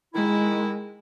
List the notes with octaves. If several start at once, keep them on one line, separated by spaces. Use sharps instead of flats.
D#3 G#3 E4